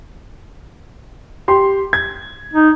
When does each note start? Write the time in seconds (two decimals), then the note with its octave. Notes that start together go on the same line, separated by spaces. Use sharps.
1.48 G4 C6
1.93 G#6
2.54 D#4